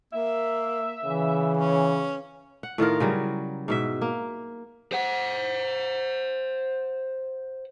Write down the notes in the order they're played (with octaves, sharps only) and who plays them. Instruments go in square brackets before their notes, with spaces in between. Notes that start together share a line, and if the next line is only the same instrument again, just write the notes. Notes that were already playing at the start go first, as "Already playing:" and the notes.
[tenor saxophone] A#3 [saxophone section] E5
[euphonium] C#3 [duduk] E3
[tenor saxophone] C#4
[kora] F#5
A2 D#3 F4 A#4
C#3 F#3 G3
G#2 B2 E5
A#3
[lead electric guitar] C5 F#5